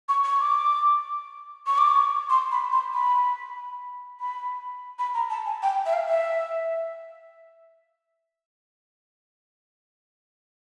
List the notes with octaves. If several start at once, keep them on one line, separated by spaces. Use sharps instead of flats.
C#6
C#6
D6
C#6
D6
C#6
C6
B5
C6
B5
B5
B5
A#5
A5
G#5
G5
E5
F5
E5